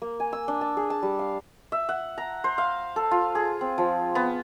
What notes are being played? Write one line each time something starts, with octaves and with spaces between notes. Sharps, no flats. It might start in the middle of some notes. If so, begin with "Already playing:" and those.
A#3
G#5
E6
D4
A5
G#4
A5
G3
F5
E5
F#5
A#5
C5
F5
A4
F4
G#4
C4
F3
B3